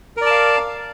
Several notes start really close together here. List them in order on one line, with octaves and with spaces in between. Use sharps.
A#4 D5 A5 F5